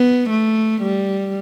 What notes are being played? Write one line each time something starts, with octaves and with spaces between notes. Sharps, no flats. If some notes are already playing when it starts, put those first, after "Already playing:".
Already playing: B3
A3
G3